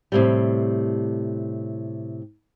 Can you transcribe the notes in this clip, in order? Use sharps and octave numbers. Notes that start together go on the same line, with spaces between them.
A2 C3 G3